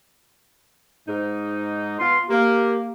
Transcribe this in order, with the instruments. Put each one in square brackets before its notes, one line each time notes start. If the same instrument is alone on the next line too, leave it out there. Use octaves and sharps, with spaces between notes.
[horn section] G#2 D#4
[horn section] B3 F4 [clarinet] C6
[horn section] A#3 [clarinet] G4